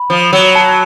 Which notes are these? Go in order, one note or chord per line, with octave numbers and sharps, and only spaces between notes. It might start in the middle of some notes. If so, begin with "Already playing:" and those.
Already playing: B5
F3
F#3
A5